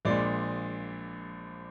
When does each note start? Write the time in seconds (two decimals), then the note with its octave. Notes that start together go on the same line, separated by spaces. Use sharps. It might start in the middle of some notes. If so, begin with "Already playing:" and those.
0.05 A#1 A#2 G#3 D5